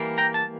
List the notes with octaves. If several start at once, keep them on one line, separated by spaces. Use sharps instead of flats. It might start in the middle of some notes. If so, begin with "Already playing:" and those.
Already playing: E3 G3 A#3
G5 A#5
A5